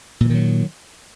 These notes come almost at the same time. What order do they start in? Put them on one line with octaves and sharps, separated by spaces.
A#2 E3 D#3 F#3